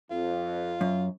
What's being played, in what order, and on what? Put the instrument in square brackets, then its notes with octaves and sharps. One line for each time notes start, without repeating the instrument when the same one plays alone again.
[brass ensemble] F2 [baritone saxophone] F4
[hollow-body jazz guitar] F#2